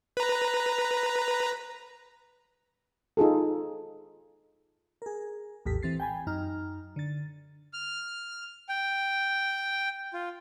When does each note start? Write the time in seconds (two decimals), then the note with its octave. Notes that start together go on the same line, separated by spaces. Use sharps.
0.17 B4 A#5
3.17 D#4 F4 G#4 A4
5.02 G#4 A#4
5.66 A#1 E2 A2 G4 A4 B6
5.82 E3 C4 A6 C7
6.00 G5 G#5 B5
6.27 F#2 D#4 A#5 F6
6.96 D3 A6
7.73 F6
8.69 G5
10.14 F4